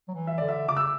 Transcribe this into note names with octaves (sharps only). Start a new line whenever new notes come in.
F#3
E3
E5
D3 D5
E5
C#3 D6
E6